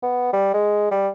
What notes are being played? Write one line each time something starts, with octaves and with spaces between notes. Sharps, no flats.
B3
G3
G#3
G3